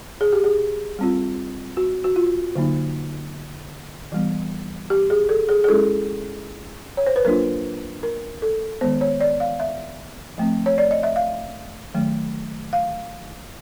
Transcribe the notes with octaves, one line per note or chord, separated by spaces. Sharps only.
G#4
G4
G#4
G3 C4 F4
F#4
F#4
F4
D3 F#3 A#3 D#4
E3 G3 B3
G4
G#4
A4
G#4
G#4
G#3 C#4 E4 A4
C#5
C5
B4
F#3 A#3 D4 F4 A#4
A#4
A4
D#3 G#3 B3 C5
C#5
D5
F5
E5
F3 A3 C4
C#5
D5
D#5
E5
F5
D#3 F#3 A3
F5